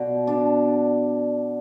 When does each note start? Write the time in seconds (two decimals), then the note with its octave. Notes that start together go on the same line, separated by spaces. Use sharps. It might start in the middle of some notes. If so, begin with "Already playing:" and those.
Already playing: B2 D5
0.27 D4 D5